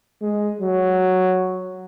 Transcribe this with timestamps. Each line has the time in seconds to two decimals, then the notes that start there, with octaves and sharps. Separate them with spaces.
0.22 G#3
0.61 F#3